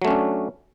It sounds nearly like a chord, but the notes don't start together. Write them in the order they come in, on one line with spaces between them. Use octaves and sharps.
F#3 A3 C#4 D4